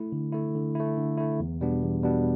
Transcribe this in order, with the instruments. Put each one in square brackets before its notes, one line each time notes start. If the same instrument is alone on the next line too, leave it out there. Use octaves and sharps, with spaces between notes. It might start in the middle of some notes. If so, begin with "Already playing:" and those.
Already playing: [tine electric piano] A3 E4
D3
A3 E4
D3
A3 E4
D3
A3 E4
E2
B2 G3 B3 D4
E2
B2 G3 B3 D4